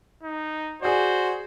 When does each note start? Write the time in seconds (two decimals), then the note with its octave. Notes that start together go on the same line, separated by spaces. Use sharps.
0.23 D#4
0.82 F#4 G#4 C5 D5